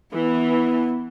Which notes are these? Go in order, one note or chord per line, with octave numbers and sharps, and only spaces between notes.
E3 B3